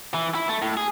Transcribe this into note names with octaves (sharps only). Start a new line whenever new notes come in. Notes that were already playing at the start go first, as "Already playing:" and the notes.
E3
E4
A3
A2
G#4